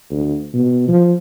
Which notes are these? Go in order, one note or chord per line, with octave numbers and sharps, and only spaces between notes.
D2
B2
F3